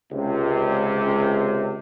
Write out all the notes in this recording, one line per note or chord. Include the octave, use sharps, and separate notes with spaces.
C#2 C3